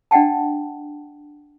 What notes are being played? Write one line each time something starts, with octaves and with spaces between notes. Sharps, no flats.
D4 D#5 F#5 G5 A5